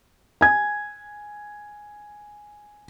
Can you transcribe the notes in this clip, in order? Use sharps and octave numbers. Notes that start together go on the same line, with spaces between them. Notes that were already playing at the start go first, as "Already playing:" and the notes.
G#5 G#6